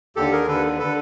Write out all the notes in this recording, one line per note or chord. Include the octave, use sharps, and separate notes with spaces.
D#2 D3 G4 A4
G#4 A#4
D#2 D3 A4 B4
D3 A4 B4